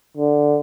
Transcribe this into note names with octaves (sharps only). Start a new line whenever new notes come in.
D3